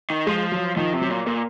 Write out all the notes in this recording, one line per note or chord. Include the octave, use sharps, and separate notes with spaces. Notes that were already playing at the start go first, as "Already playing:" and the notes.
D#3
F3 G#3
F#3
D#3 F3
C3
F#3
A#2
A#2 A#3